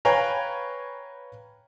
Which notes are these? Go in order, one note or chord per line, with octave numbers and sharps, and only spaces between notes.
B4 C#5 F5 G5 G#5 A#5